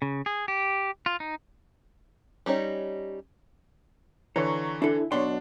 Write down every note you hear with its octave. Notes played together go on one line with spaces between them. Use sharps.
C#3
G#4
G4
F4
D#4
G3 C#4 D#4 C#5
D3 E3 C#5 A#5 C#6
D4 E4 A4
B1 B2 D4 C#5 C6